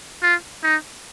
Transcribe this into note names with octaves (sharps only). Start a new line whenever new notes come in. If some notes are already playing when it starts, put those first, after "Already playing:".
F4
D#4